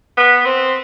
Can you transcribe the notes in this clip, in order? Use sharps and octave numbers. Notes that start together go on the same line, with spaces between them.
B3
C4